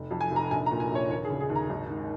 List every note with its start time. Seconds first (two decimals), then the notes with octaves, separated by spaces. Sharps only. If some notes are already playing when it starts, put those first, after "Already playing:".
Already playing: F1
0.11 F2
0.21 G#5
0.31 F1 A#5
0.51 A#1 G#5
0.66 A#5
0.71 A#2
0.80 G#5
0.91 A#1 C#5
1.10 D#2 C#5
1.25 G#4
1.30 C#3
1.41 G#4
1.50 D#2
1.56 A#5
1.69 G#1
1.90 G#2